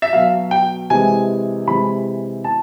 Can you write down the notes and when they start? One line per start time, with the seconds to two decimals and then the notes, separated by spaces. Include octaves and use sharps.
0.02 E5
0.13 B2 F#3 F5
0.51 G5
0.90 C3 E3 G#3 G#5
1.67 C3 E3 G#3 B5
2.44 B2 A5